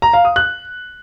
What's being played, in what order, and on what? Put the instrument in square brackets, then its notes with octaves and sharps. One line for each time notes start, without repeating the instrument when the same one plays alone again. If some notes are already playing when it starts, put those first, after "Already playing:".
[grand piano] A#5
F5
D#6
F#6